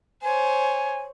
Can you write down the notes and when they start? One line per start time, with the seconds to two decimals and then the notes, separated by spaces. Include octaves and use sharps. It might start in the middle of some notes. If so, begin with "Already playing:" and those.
0.23 C5 C#5 G#5